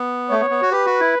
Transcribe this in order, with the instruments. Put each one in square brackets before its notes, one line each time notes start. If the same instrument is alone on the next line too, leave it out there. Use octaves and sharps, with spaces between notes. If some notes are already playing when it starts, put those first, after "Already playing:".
Already playing: [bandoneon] B3
[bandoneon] A3 [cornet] C#5
[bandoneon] B3
B3
F#4
[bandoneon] G4 [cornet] B4
[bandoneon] F#4
E4